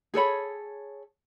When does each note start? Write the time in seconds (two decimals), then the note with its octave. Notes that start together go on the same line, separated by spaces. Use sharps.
0.14 G#4 A4 C#5 B5